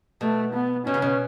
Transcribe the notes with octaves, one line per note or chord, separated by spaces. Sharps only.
B2 A3
B3
B2 C#4
C#3
B2